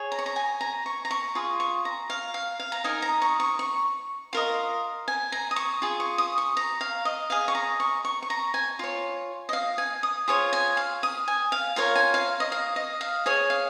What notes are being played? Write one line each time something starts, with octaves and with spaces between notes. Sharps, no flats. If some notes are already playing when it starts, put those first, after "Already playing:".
Already playing: G#4 C#5
A#5
C#6
A#5
G#5
A#5
C#6
A#5
C#6
F4 G#4
C#6
A#5
F5
F5
F5
A#5
D#4 A#4 D#5 G#5
A#5
C#6
C#6
C#6
F4 A#4 D#5
G#5
A#5
D#6
C#6
F4 G#4
C#6
D#6
C#6
A#5
F5
D#5
G#4 D#5 F5
C#6
A#5
C#6
C#6
C#6
A#5
G#5
F4 C#5
D#5
F5
G#5
D#6
F4 G#4 C#5 C#6
G#5
F5
D#6
G#5
F5
F4 A#4 C#5 F5
G#5
F5
D#5
F5
D#5
F5
G#4 C#5 G#5
F5